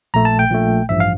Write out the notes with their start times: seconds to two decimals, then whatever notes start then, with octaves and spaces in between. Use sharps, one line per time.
0.14 A#1 A#2 A3 A#5
0.25 A5
0.39 G5
0.51 A#1 A#2 A3
0.89 A1 G2 F3 E5
1.00 F5